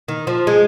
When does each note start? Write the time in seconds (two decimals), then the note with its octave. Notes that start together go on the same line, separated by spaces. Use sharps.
0.08 D#3
0.27 F3
0.47 G#3